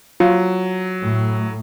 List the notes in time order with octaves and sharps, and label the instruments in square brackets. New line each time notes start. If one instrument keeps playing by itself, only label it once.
[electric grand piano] F#3 [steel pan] F4
[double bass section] A2